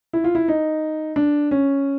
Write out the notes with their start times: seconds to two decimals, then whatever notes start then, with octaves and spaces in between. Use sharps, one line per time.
0.13 E4
0.24 F4
0.35 E4
0.48 D#4
1.16 D4
1.51 C#4